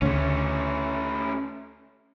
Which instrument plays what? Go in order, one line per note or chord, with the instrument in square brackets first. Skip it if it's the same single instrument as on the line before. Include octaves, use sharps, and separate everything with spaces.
[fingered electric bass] D2 C#3 [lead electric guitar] A3 C#4